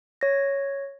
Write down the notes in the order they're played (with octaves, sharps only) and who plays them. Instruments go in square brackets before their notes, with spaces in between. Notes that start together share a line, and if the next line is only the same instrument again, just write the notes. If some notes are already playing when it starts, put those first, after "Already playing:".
[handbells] C#5 A#6